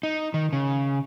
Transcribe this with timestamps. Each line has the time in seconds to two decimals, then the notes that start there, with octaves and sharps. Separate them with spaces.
0.03 D#4
0.34 D#3
0.53 C#3